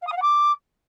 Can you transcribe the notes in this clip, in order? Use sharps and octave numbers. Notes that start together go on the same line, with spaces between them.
F5
D#6
F5
F#5
D6